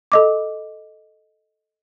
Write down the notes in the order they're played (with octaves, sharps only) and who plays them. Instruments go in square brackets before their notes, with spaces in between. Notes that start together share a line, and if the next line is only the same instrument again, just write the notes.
[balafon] A4 D#5 D6